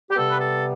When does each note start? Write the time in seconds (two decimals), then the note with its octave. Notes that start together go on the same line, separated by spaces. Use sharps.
0.10 G4
0.16 C3 G3 B3 A4
0.30 B4
0.41 A4